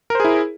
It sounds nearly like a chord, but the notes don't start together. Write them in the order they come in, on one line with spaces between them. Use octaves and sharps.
A#4 C5 G#4 E4